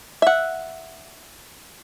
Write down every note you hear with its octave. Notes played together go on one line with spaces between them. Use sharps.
E5 F#5